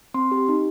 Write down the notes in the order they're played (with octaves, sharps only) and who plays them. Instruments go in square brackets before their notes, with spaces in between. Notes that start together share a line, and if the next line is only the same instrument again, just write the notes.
[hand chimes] C4 C6
G4
D#4